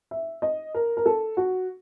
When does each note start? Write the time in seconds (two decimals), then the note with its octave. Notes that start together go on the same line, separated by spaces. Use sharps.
0.11 E5
0.42 D#5
0.74 A#4
0.97 A#4
1.06 A4
1.37 F#4